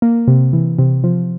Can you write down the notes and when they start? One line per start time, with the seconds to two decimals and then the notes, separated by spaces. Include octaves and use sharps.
0.02 A#3
0.28 C3
0.53 E3
0.79 C3
1.04 F3